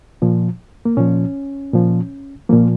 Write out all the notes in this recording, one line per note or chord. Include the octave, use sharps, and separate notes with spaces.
A#2 F3
A#3
A#2 F3 C#4
A#2 F3
A#2 F3 A#3